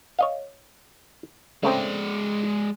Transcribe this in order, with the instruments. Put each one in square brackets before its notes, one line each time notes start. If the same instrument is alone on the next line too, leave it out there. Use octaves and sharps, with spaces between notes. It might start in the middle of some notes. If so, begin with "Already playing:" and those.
[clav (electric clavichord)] C#5 D#5 F5
[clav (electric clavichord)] C#3 A3 C4 [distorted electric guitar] G#3 D5